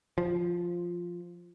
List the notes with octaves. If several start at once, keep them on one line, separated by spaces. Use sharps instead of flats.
F3